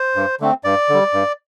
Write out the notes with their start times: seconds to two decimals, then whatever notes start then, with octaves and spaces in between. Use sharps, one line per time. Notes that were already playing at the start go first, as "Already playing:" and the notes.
Already playing: C5
0.15 G2
0.40 D3 A3 C4
0.64 G2 D5
0.89 D3 G3
1.13 G2